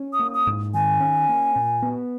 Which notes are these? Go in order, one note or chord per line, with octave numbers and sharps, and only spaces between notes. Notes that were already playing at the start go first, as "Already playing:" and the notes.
Already playing: C#4
D#6
A#3
D#6
G#2
D#3 G#5
C#4
A#3
A#2
B3